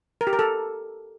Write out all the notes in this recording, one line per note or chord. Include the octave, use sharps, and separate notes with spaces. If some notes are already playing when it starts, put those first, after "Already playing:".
A#4
G4
A#4
A4